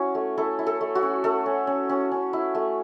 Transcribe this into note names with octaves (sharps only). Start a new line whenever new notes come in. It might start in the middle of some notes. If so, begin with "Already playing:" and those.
Already playing: C#4 E4 F#4
A3
E4 A4
E4
A4
A3
F#4
C#4
A3 A4
C#4
C#4
C#4
C#4
E4
A3